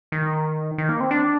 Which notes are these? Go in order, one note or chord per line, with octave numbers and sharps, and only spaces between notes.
D#3
D#3
A#3
C4
D4